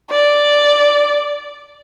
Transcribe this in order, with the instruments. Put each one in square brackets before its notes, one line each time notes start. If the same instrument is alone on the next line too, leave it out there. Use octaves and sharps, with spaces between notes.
[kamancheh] D5